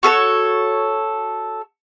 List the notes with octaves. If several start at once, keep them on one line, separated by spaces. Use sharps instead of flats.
F#4 A4 B4 C#5